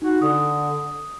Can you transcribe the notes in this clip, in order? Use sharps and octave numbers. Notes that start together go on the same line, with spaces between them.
D#4 F#4
D3 D#6